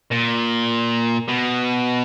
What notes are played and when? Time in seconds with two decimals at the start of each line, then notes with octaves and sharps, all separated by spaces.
0.12 A#2
1.28 B2